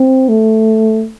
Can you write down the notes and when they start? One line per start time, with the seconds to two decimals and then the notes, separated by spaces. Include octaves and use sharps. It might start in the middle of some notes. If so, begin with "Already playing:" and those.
Already playing: C4
0.29 A3